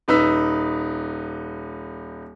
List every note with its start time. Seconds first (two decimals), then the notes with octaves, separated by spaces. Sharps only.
0.08 D#1 D#4 B4 E6 B6